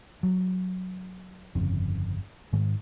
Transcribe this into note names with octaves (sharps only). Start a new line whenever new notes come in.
F#3
G1 F2 C#3
G#2 D#3 G#3